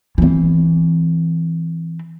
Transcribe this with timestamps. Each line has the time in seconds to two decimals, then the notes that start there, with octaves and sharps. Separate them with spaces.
0.18 E3 C4